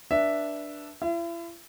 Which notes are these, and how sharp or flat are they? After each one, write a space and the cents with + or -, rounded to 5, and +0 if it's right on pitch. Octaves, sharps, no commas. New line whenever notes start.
D4 +0 B4 -20 E5 +0
E4 +40 E5 +40